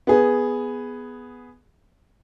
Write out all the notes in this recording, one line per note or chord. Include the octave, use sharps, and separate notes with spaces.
B3 G#4